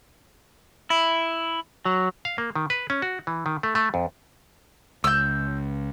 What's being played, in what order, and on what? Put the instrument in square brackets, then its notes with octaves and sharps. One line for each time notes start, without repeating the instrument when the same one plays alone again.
[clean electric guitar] E4
F#3
[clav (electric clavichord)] F5
A#3
D#3
B4
C#4
F#4
E3
D#3
A3
A3
F2
[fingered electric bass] C#2 [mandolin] E6 G6